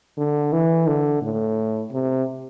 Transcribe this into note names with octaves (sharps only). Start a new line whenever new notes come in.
D3
E3
D3
A2
C3